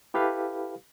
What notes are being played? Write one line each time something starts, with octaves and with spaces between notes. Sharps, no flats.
E4 G4 A4 B4 F5